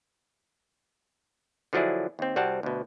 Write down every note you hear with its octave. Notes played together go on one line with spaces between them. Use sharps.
D3 F3 F#3 D4 E4 G#4
D#2 C4
C2 G3 C4 F#4 F#5 A5
D2 B2